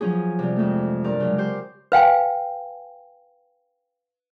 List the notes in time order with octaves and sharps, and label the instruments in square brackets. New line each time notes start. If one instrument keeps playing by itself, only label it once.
[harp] F3 F#3 C#4 G#4
C3 G3
F2 G#3 A3
G2 A#4 D5
C#3 F#3 G#3
G4 C5
[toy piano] B4 F5 G5 G#5